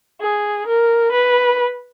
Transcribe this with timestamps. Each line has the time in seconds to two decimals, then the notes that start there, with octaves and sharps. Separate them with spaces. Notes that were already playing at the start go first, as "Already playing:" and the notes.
0.21 G#4
0.67 A#4
1.12 B4